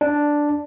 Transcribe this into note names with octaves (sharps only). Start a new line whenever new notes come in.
D4